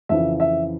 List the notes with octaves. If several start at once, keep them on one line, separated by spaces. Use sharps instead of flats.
F2 C#3 E3 E5
E5